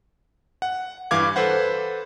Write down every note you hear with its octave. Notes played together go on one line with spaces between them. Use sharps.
F#5
G2 E3 F5 D6 G#6
A4 B4 C5 F#5